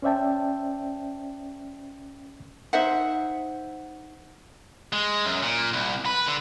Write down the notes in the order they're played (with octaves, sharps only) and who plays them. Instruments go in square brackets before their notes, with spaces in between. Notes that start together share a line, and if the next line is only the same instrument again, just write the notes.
[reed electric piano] C#4 C5 D5 E5 G5 A5
[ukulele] D#4 C5 E5 F#5
[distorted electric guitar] G#3
F#2
A#2
C2
B4
D3